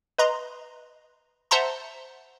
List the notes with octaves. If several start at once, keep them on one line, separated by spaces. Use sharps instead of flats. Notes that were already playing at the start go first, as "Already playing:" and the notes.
B4 D#5 A#5 C6
C5 E5 F#5 A5 A#5 C6